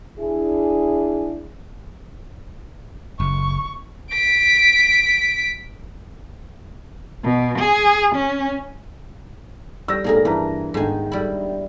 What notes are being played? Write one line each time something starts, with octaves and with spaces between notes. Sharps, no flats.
D4 E4 G#4
F#1 C#6
B6 D7
B2
G#4
C#4
G3 E6 A#6
B1 A2 A#3 G#4 A#4
G2 E3 A#5
G1 G#2 D#3 G#5
G3 E4